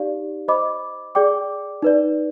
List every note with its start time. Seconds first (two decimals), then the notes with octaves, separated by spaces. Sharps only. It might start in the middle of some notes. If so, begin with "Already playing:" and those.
Already playing: D#4 G4 D5 F5
0.48 C5 D#5 B5 D6
1.15 G#4 D5 G5 D6
1.82 D#4 B4 D5